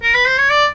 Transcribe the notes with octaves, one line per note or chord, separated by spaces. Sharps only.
A#4
B4
C5
C#5
D5